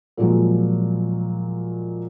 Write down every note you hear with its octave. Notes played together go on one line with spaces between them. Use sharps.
A#2 F3 F#3 G#3